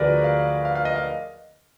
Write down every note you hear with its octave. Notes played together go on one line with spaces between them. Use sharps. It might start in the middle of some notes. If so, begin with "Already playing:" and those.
Already playing: D2 D3 F3 F#4 G#4 A#4 B4 D5
F5
F5
F5
D#5
F5